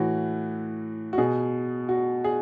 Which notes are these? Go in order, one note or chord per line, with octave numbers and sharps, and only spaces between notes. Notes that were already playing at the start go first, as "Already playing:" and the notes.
Already playing: A2 E3 F#4
F#4
B2 G#4
F#4
G#4